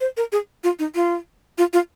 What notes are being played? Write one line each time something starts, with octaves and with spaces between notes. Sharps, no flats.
C5
A#4
G#4
F4
D#4
F4
F4
F4